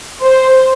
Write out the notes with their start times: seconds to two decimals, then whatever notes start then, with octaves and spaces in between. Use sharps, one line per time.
0.23 C5